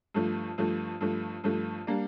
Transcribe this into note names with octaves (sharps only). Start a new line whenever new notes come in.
G2 F3 A3
G2 F3 A3
G2 F3 A3
G2 F3 A3
G3 A#3 D4